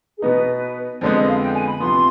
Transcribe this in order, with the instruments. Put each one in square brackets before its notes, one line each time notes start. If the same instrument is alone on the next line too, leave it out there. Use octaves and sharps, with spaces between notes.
[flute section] G#4
[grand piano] B2 B3 D#4 [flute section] B4
[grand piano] F2 D3 G#3 B3 [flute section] C5
[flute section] D#5
F5
G5
G#5
B5
[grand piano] D2 C3 F3 B3 [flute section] C6